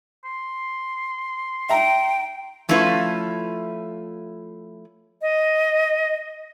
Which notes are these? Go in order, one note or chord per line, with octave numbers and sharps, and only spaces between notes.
C6
E5 G5 A#5
F3 A3 C#4 E4 F4 B4
D#5